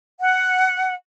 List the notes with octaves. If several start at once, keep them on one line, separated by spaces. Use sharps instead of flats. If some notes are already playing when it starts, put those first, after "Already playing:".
F#5